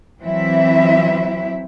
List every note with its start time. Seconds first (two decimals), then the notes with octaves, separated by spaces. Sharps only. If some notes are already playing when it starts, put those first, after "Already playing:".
0.21 E3 F#3 C4 E4 E5